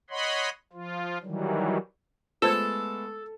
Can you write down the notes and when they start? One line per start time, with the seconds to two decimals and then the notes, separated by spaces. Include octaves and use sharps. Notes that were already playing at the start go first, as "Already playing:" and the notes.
0.10 C#5 D#5 F#5 B5 C6
0.73 F3 F4
1.23 D#3 E3 F#3 G3
2.42 G#3 A3 B3 F4 A4 C5 E6 G#6